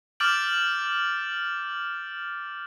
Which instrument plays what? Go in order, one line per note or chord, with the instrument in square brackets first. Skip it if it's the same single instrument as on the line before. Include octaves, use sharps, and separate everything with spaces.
[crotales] D6 F6 G6 A6 D7 F#7